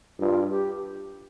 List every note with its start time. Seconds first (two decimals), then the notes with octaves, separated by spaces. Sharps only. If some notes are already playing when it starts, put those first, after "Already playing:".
0.20 G2 F4
0.50 G4